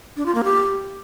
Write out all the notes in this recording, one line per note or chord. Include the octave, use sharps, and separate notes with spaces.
D4
F4
A#3
G4